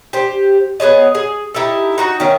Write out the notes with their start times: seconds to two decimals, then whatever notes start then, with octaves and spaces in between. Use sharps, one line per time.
0.13 G4 C5
0.80 B3 G#4 C#5 D#5
1.15 G#4
1.54 D#4 E4 G4 A4
1.98 D#4 F#4 G5
2.20 D#3 A3 C#4